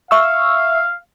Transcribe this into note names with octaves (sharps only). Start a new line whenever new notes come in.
E5 F5 C#6 E6